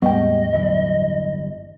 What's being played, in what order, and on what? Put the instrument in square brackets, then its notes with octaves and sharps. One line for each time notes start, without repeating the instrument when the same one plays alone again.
[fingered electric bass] E2 A2 G#3 [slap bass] G3 [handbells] B3 G5 [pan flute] D#5
[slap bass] G1 E3 F#3